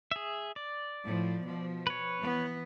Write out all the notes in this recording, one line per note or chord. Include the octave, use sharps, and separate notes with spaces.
G#4 E5
D5
A2 F3
B2 F3
B4 C#5
E3 B3